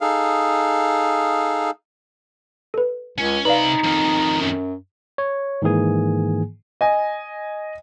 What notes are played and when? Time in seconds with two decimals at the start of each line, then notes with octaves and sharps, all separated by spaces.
0.01 D#4 G#4 A4 F5
2.74 A4 B4
3.18 C#2 C#4
3.45 C3 D#4 B4 D5 F5 B5
3.84 F2 D#3
4.41 F#2
5.18 C#5
5.62 G#2 D#3 E3 A#3 G#4 G#5
6.81 D#5 G#5